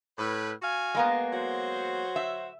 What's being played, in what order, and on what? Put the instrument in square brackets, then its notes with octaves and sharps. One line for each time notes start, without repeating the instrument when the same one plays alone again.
[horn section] A2 B4
F#4 F5 G#5
[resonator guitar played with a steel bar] G#3 A#3 B3
[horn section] F#3 F#4 C5
[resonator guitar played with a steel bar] E5